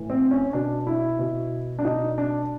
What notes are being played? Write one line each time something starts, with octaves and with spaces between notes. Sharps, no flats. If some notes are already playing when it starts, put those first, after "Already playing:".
Already playing: A2 E3
C4
C#4
B2 D4
E4
B2
D4
B2 D#4
D4